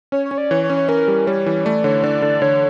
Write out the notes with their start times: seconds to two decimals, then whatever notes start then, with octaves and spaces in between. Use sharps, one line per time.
0.12 C#4 C#5
0.25 C#5
0.31 C#4
0.38 D5
0.51 E3 C#5
0.64 C#5
0.70 C#4
0.76 C#5
0.89 C#4 A#4
1.08 G3
1.27 G3 C#5
1.46 E3
1.65 A3 D5
1.84 D3 C#5
2.04 D3 D5
2.22 D3
2.42 D3 C#5